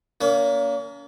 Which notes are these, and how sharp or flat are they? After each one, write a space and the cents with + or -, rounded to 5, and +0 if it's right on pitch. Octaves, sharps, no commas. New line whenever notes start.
A#3 -5 C#4 +45